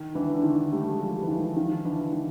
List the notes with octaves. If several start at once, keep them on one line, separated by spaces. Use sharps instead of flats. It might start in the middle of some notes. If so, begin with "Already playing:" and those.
Already playing: D#3
D3 E3
D3
D#3
G3 A3
G#3
F3 G3
E3
D#3 F3
D#3 F3
D3 E3
D#3